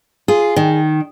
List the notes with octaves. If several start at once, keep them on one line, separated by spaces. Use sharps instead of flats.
F4 G#4
D#3